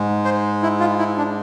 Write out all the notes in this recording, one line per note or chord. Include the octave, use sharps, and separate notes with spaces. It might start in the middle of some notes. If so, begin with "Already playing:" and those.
Already playing: G#2 G#3
C5
E4
F4
E4
D4